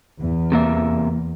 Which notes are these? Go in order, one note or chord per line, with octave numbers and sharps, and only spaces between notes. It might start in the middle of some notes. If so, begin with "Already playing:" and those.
E2
C3 A#3 E5